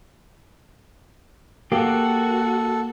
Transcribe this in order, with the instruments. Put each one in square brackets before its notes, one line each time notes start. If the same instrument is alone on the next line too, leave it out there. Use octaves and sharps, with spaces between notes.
[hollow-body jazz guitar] A#3 G4 [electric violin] F#4 [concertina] A4